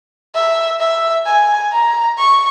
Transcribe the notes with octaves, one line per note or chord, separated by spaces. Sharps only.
E5
E5
G#5
A#5
C#6